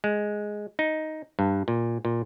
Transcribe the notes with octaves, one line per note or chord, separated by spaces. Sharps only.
G#3
D#4
G2
A#2
A#2